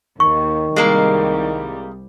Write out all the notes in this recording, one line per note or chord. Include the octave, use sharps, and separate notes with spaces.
D#2 D#3 C#6
C2 G3 G#3 A#3 A#4